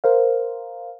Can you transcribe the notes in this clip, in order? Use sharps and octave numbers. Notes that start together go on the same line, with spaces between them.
A#4 C5 F5